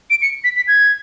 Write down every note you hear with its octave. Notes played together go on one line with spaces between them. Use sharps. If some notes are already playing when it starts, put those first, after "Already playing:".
D7
C#7
B6
B6
G#6